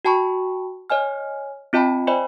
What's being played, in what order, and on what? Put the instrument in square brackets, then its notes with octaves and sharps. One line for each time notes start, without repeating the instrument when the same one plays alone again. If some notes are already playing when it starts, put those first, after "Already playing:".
[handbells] F#4 G5 A5 B5 C#6
C#5 D#5 G#5 F6
C4 F4 D#5 G5 A5 B5
C5 D5 D#5 G5 G#5 B5